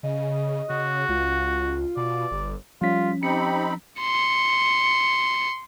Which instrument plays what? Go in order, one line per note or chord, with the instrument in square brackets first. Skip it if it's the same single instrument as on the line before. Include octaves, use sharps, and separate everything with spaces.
[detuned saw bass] C#3 [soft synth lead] D#5
[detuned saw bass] C#3 [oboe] F#4
[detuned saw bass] C#2 [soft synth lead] F4
[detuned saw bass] B2 [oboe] D5
[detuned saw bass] G1
[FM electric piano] F3 C#4 [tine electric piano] G3 B6 [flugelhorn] F4
[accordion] C4 D#4 B5 [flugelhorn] G4 [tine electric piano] C#7
[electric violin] C6 C#7